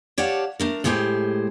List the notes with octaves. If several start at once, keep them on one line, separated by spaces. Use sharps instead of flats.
G4 C#5 D5 F5 F#5 A5
A3 D4 A#4
A2 G#3 A3 G4 G#4 C5